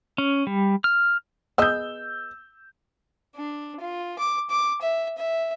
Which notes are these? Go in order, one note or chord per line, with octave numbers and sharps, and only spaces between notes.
C#4
G3
F6
B3 G#4 D#5 E6 G6
D4
F4
D6
D6
E5
E5